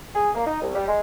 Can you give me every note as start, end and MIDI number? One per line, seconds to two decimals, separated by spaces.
0.15 0.29 68
0.35 0.45 58
0.47 0.61 63
0.62 0.71 36
0.75 0.86 55
0.87 1.00 56